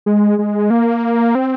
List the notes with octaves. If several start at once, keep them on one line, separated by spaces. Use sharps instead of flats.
G#3
G#3
A#3
C4